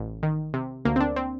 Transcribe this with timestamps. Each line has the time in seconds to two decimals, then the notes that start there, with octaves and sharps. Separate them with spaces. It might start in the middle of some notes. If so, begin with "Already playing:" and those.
Already playing: A1
0.23 D#3
0.54 C3
0.85 D2 A#3
0.96 C4
1.00 D4
1.16 C4